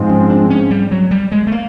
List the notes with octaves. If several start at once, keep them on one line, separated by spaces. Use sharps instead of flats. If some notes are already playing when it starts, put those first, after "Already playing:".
Already playing: G#2 F3 G#3 C4
C#4
D4
C#4
G3
F#3
G3
G#3
A3
A#3